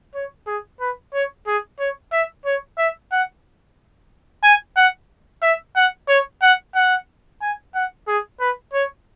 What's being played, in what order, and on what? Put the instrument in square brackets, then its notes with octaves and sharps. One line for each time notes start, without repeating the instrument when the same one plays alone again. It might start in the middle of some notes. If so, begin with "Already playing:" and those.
[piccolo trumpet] C#5
G#4
B4
C#5
G#4
C#5
E5
C#5
E5
F#5
G#5
F#5
E5
F#5
C#5
F#5
F#5
G#5
F#5
G#4
B4
C#5